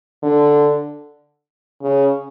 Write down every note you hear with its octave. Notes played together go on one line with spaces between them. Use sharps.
D3
C#3